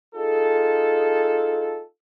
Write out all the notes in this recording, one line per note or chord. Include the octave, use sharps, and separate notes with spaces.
D#4 F4 G#4 A4